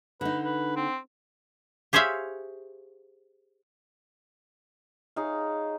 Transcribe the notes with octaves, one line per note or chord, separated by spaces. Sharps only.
D3 D#4 B4
B4
C4
G4 G#4 C5 C#5 E5 F5
D#4 G#4 C#5 F5